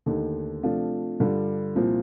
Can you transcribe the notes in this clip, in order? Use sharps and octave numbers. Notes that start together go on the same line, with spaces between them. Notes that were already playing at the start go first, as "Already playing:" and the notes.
D#2 D3 A3 D#4
C3 F3 A3 D4 F4
G2 D3 G3 D4 F4
C2 A#2 F3 C4